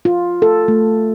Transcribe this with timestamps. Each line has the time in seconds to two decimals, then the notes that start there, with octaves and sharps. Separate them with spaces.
0.05 F4
0.42 A4
0.68 A3